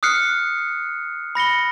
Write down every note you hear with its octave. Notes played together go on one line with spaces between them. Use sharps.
D#6 F6 F#6 C7 C#7
B5 A#6 C#7 G7